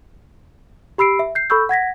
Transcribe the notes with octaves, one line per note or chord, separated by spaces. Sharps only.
G4 B5 E6 C7 D7
E5
G6 C7
A4 B5 C#6 E6 G6
F#5 G#6 A#6 B6